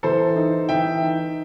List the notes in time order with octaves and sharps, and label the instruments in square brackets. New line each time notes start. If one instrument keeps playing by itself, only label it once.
[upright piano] E3 [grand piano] A4 C5
[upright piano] D#4
[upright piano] E3 [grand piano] E5 G5
[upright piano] D#4